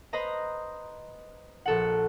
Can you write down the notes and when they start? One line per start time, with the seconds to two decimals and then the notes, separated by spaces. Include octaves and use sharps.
0.13 B4 C5 D#5 A#5
1.66 A#1 A4 F#5